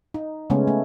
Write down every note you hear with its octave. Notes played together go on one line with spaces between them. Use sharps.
D#4
C#3 G#3 A3 B3 C#4
A3